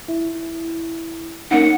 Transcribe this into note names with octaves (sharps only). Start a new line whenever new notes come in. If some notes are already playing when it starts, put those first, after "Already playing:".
E4
A#3 C#4 D#4 F#5